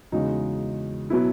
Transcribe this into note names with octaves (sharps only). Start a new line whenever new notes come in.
E2 C#3 G#3 D#4 F#4
B2 F#3 B3 E4